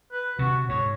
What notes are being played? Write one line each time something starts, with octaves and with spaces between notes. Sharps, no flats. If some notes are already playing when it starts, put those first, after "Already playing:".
B4
C3 F#4
G#2 C#5